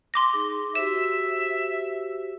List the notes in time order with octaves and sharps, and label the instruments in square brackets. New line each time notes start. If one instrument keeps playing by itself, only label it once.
[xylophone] C6 D6 A#6
[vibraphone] D#4 G#4
[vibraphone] F#4 G4 C5 [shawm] E5 [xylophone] E7